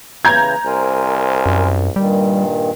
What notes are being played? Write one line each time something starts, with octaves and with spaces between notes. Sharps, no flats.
C#3 E3 A#5 G6 G#6
C2 A#4 C5 G#5
F#2
G2 A#2 D#3 G3